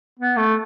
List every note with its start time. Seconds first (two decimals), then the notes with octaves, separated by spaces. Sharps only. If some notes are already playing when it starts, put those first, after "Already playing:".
0.19 B3
0.36 A3